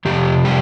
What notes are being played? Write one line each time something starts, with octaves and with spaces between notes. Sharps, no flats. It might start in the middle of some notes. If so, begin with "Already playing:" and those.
F2 C3 F3 G4
G3 G4